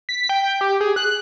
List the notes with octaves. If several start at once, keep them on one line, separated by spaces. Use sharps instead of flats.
B6
G5
G4
G#4
F#6